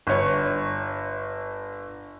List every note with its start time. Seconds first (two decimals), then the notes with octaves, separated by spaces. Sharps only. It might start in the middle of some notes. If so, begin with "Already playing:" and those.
0.07 G1 C#5